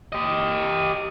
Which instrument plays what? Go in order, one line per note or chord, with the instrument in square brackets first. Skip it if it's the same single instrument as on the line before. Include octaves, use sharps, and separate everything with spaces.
[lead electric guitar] G4 D#5